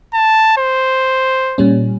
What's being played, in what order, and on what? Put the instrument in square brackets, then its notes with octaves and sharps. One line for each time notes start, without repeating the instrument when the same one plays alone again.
[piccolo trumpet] A5
C5
[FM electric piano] A#2 G3 C#4